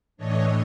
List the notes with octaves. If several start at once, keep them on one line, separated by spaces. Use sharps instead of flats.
A2 E3 A3 D4 C#5 D#5